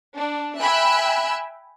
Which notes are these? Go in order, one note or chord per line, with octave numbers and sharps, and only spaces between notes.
D4
E5 G5 G#5 B5 E6 F#6